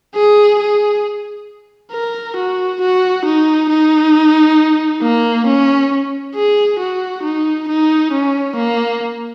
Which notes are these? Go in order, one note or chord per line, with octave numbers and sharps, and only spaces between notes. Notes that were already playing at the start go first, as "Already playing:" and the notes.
G#4
G#4
A#4
F#4
F#4
D#4
D#4
A#3
C#4
G#4
F#4
D#4
D#4
C#4
A#3